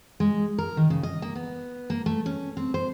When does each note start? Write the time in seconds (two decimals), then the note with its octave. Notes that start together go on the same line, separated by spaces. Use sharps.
0.20 G#3
0.58 A#4
0.77 D#3
0.90 C#3
1.03 D#5
1.22 A#3
1.35 B3
1.90 A#3
2.06 A3
2.26 C#4
2.57 C4
2.74 C5